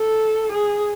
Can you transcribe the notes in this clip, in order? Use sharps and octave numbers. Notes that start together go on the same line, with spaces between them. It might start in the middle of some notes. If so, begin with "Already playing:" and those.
Already playing: A4
G#4